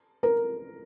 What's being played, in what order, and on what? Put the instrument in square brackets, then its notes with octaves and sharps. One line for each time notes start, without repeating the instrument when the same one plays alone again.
[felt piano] A#4